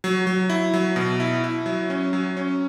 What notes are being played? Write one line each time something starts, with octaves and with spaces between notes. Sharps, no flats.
F#3
F#3
E4
F#3
B2
E4
E4
F#3
C#4
F#3
C#4